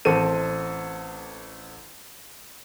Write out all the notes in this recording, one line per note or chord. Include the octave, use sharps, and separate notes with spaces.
A1 C4 A4 D#7